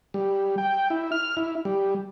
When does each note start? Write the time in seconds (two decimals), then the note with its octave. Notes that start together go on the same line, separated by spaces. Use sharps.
0.14 G3
0.58 G5
0.90 E4
1.12 F6
1.37 E4
1.65 G3